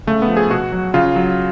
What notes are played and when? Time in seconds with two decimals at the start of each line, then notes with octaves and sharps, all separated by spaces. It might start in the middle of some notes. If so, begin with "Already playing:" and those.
0.07 C#3 A3
0.22 B3
0.28 F3
0.37 G#4
0.50 B2 F#4
0.72 F#3
0.94 C#3 F4
1.16 F#3